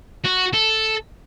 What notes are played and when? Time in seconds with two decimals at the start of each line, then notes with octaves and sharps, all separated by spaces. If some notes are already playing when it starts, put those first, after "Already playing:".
0.24 F#4
0.53 A4